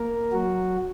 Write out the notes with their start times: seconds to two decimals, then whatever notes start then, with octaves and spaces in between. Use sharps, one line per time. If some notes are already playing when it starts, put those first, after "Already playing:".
Already playing: A#3 A#4
0.32 F#3 F#4